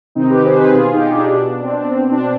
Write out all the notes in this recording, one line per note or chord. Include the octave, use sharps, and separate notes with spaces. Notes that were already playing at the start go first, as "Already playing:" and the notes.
C3 D#3 C4 D#4
G4 B4
G#4 C5
G4 B4
B2 F4 G#4
D#4 G4
D4 F4
B2 D4
C4
D4
B2 C4
D4